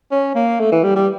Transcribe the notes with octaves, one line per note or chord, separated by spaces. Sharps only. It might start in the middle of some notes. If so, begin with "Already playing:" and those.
C#4
A#3
A3
E3
G3
G3